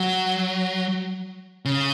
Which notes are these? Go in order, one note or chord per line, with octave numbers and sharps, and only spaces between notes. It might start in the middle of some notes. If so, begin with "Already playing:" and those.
Already playing: F#3
C#3